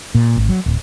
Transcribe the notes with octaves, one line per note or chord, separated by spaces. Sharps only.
A#2
G#1
F#3
D1